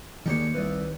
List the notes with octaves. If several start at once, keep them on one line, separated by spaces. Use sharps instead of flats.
D#2 D#3 G#3 A#3 D4 G4 C#5
C2 B4 D5